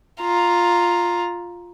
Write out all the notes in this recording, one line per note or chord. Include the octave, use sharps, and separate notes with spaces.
F4 A#5